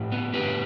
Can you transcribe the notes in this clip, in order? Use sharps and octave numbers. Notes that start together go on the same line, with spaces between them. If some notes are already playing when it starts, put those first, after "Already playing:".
Already playing: A2 G4 B4
B3
A2 G4 B4